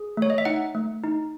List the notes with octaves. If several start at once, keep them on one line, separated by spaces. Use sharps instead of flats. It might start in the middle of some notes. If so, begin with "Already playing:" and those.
Already playing: G#4
A3 C#5
D#5
E5
D#4 F#5
A3
D#4